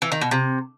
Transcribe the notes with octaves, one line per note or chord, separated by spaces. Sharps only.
E3
D#3
B2
C3